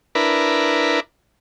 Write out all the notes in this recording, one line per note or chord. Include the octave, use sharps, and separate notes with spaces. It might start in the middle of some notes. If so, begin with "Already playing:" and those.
D4 E4 A#4 B4